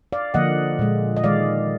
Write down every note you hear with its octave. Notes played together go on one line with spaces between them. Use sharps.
D5 F5
D3 F3 A#3 D#5 F#5
A#2 G#3
D#5
D#3 G#3 D5 F5